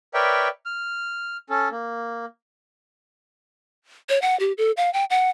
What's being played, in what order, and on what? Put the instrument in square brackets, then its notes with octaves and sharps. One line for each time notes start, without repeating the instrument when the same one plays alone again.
[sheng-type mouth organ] A#4 B4 C#5 D5 E5 G5
F6
C#4 A4
A#3
[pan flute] C#5
F#5
G4
A4
F5
G5
F#5